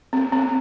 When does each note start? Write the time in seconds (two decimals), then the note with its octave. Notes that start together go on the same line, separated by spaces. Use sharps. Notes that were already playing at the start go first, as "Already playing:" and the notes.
0.13 C4
0.32 C4